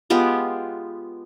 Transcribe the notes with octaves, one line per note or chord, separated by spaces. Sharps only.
G#3 B3 F4 G4